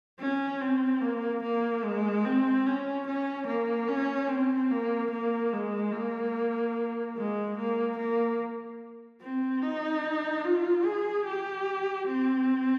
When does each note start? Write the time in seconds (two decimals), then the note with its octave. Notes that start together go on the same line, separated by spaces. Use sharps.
0.20 C#4
0.61 C4
1.01 A#3
1.43 A#3
1.84 G#3
2.25 C4
2.66 C#4
3.07 C#4
3.47 A#3
3.88 C#4
4.29 C4
4.71 A#3
5.11 A#3
5.53 G#3
5.93 A#3
7.16 G#3
7.57 A#3
7.98 A#3
9.22 C4
9.62 D#4
10.44 F4
10.85 G#4
11.25 G4
12.07 C4